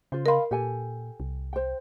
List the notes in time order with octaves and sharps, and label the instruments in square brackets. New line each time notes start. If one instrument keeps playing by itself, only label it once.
[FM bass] C#3 [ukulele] F4 C5
[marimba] A#4 C6 [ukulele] D#5 F5 B5
[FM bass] A#2 [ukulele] G4 A4 G#5
[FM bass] C2
[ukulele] C5 G5